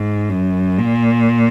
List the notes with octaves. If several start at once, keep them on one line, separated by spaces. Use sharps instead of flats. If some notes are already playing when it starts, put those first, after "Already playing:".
Already playing: G#2
F#2
A#2